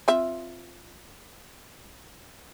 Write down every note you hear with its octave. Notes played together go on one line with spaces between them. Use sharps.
C4 F4 E5